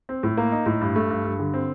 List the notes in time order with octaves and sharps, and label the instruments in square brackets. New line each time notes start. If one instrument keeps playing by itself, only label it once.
[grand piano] C4
A2
A#3
D#4
A2
G2
A3
G2
G2
D3
C4